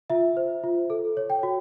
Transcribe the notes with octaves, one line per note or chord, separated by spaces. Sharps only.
F4 E5
C5
F4
A4
C#5
G5
F#4